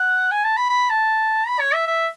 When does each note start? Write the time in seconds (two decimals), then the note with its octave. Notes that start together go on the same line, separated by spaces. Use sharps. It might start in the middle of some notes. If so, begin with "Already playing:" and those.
Already playing: F#5
0.31 G#5
0.44 A5
0.57 B5
0.69 B5
0.90 A5
1.47 B5
1.60 C#5
1.74 E5
1.87 E5